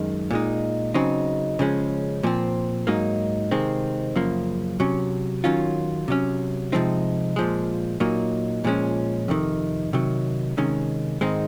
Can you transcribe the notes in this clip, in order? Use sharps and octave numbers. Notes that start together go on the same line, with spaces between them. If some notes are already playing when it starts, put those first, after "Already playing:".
Already playing: F#2 D#3 G#3
A#2 G#3 D#4
C#3 F#3 C4 D#4
C#3 F3 G#3 C#4
A#2 F3 C4
G#2 F#3 A#3 D#4
C3 D#3 G#3 C4
F#2 C#3 F3 A#3
C3 F#3 C#4
D#3 F#3 C#4 F4
C3 F#3 C#4
C3 F3 G#3 C4 D#4
A#2 F3 G#3
A#2 F#3 A#3 D#4
A#2 F3 G#3 C#4
F2 C3 D#3
C3 D#3 F#3
C3 D#3 G#3 C#4
G#2 D#3 G#3 C4 D#4